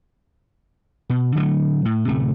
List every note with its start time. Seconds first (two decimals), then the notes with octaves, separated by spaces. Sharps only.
1.10 B2
1.35 D3 F#3 G#3 A3
1.85 A2
2.08 D1 C3 A3